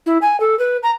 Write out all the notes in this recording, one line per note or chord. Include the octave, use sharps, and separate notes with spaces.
E4
G#5
A4
B4
A#5